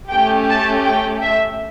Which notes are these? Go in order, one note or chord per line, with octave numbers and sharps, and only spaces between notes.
A3 C#4 G4 G5
A5
G5
E5